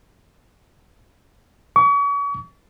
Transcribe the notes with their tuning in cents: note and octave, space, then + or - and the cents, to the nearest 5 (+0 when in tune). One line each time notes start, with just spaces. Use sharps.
C#6 +40